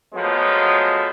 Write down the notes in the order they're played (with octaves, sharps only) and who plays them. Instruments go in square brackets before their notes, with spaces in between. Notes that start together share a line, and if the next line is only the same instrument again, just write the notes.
[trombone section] F3 F#3 G#3 A3 B3